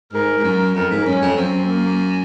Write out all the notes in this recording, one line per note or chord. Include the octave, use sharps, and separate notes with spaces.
G#2 A#4
G#2
F#2
F2 A#4
G#2
F#2 C#4
F2
F#2 C4
A#3